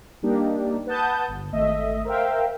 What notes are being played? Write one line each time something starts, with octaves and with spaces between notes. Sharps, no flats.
G3 A#3 D4 D#4 G4
B4 F#5 A5 D#6 G6
G1
G#1 A3 D#5 E5
A#4 C5 E5 F5 G5